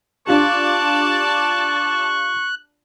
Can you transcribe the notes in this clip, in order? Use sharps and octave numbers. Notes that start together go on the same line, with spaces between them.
D4 F4 G4 D5 A5 C#6 F#6